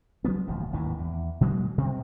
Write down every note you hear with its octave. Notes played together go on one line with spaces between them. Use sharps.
F3 F#3 A#3 B3
D#1 G#1 D2 F3
G#1 D#2 A2 E3
E2
A#2 F#3 G#3 A#3
B2 G3 C4